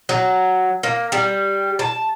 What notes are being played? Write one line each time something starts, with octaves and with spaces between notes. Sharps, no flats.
F#3
A#3
G3
A5